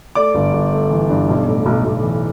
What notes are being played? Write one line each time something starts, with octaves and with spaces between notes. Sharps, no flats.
A3 D5 D6
G1
G1
A3
E3
G2
B1
A2
B1
B1
E3